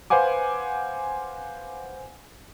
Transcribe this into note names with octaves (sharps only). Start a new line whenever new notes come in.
B4 C5 F5 F#5 G#5 D6